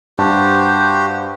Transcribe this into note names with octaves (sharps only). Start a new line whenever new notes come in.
G2 F#4 G4 C5 A5